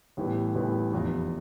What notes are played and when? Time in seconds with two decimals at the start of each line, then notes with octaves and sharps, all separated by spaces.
0.17 A1 A2 E3 G3 B3
0.55 A1 A2 E3 G3 B3
0.92 F1 E2 C3 F3